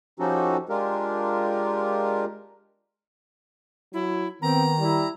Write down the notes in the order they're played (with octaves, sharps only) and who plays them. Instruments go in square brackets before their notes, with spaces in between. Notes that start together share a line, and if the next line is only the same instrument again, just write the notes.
[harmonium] F3 C#4 D#4 F#4 G4 A4
G#3 D4 F4 G4 A#4
[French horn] F#3 [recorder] E4
[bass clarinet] D#3 [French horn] B3 [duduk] C4 [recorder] A#5
[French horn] G3 [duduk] E4